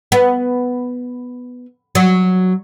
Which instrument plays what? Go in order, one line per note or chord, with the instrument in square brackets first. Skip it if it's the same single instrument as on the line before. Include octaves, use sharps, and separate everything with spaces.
[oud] B3
F#3